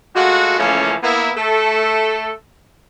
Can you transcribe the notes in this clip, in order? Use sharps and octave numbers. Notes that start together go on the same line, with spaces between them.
G#3 A3 F4 F#4
C#3 E3 F3 A3 A#3 C#4
A#3 B3 E4
A3 A4